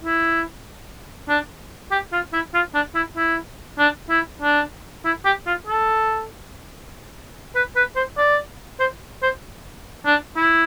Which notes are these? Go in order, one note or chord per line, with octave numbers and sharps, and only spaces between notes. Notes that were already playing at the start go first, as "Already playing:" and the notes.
E4
D4
G4
F4
E4
F4
D4
E4
E4
D4
E4
D4
E4
G4
F4
A4
B4
B4
C5
D5
C5
C5
D4
E4